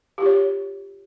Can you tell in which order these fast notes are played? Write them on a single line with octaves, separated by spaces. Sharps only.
G4 F4 C#5